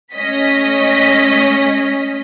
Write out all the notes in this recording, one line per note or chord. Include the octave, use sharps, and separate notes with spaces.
A3 C#4 D#5 B6